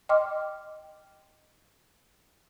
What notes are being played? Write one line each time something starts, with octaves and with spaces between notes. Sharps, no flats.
D#5 G5 C6 D6 F6